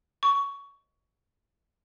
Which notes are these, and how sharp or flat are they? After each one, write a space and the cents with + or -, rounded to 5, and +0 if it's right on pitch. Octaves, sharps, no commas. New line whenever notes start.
C#6 +15